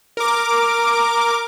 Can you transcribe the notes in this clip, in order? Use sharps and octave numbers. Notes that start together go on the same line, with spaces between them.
A#4 D6